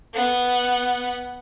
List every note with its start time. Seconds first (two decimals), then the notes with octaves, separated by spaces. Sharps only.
0.14 B3 F#5